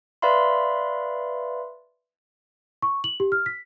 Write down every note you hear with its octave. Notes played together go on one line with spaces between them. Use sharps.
B4 D5 E5 F5 B5 C6
C#6
F#7
G4
F6
B6